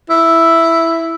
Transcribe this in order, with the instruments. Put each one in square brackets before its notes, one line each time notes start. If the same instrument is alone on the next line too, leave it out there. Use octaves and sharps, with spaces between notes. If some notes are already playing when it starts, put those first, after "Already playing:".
[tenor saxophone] E4